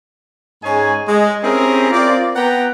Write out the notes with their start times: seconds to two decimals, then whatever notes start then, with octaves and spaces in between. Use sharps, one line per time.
0.64 G#2 G#3 C#4 G#4 G#5
1.08 G#3
1.43 C4 C#4 E4 G4 G#4 A#4
1.92 C4 F4 A#4 D5
2.36 B3 B4 F#5 G5 A#5